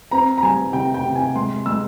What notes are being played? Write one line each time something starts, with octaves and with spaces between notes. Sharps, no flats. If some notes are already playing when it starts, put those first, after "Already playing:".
C4 A#5
A#5
G3 G#5
C3 G5
G5
C3
G#5
G#3 C6
G#3 E6